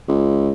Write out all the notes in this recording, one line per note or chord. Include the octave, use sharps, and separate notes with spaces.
C#2